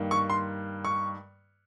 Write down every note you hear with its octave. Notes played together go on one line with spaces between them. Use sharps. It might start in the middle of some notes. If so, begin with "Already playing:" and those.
Already playing: G2 D#3 A#3
C#6
C6
C#6